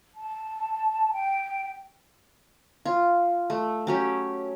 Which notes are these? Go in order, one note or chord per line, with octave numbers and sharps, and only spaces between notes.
A5
G5
F4
A3
F#3 C#4 G4